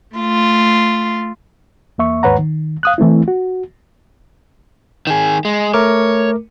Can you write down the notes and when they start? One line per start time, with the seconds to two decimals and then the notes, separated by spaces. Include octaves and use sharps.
0.17 A3 F4
1.98 E2 A#3 E5 C#6
2.23 D#2 G#2 B4 C#5 F#5 A#5
2.39 D#3
2.83 F5 D#6 F#6
2.98 E3 A3 C4 E4
3.28 F#4
5.07 D#3 G#4
5.45 G#3
5.74 A3 A#4 C#5 D6